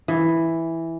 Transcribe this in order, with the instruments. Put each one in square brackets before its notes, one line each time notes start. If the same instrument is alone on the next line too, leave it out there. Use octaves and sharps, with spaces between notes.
[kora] E3